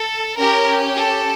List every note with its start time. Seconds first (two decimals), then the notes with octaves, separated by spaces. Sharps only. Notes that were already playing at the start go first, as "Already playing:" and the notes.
Already playing: A4
0.37 C#4 G4 A#4
0.96 A4